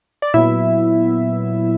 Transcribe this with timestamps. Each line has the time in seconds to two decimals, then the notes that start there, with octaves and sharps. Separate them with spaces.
0.22 D5
0.34 A#2 F#3 B3 E4 E5